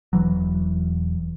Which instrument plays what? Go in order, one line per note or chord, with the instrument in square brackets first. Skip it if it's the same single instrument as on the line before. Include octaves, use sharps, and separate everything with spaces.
[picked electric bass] E1 E3 F#3